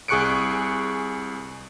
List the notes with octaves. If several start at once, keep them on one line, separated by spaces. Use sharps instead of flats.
C2 G#4 C#6 F#6 C#7 D7